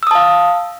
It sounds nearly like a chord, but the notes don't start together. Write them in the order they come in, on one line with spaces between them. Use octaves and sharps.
E6 D#6 A5 F5